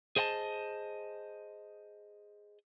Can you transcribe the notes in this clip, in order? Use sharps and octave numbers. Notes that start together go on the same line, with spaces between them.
G#4 C5 D#5 G5 A5